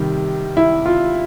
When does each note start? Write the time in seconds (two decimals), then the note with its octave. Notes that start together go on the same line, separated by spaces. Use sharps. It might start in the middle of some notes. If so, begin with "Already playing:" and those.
Already playing: C3 D#3 G3
0.57 E4
0.86 F4